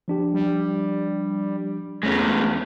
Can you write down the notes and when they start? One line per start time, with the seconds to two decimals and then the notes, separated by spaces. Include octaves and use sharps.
0.08 F3 D4 G4
0.34 G3
2.03 E2 G#3 A3 C#4 A#6 B6